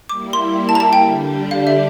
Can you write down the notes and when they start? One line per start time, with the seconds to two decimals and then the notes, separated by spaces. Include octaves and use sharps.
0.09 G3 A#3 E4 D6
0.33 C6
0.69 A5
0.75 A#5
0.80 A5
0.93 G5
1.04 D3 G3 D4 G4
1.51 F5
1.67 E5